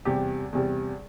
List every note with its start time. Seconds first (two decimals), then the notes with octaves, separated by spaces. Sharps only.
0.05 E2 C3 G3 G4
0.53 E2 C3 G3